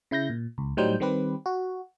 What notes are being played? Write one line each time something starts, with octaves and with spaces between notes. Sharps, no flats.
C#3 E4 G6 A#6
A#2
C#2
A2 F#3 G3 D#4 C5 G6
D#3 G3 C4 G4 B4
F#4